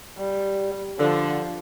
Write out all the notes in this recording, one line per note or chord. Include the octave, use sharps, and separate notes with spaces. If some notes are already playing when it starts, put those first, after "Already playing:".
G3
D3 F3